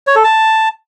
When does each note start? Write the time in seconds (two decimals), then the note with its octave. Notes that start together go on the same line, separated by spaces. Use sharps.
0.07 C#5
0.15 A4
0.24 A5